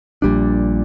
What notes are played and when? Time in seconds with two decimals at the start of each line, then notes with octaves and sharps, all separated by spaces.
0.22 A#1 A#2 G3 D4